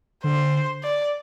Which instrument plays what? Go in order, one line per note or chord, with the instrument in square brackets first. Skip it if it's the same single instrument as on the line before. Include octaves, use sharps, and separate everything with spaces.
[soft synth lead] D3 [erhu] C5
[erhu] D5